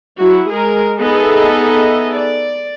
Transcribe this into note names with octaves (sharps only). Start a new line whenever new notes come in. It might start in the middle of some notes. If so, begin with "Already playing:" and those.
F#3 E4 F#4
G#3 G#4 A#4
B3 D#4 G#4 A4 D#5 E5
D5